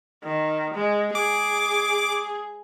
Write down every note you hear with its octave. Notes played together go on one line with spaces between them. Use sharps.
D#3
G#3
G#4 D6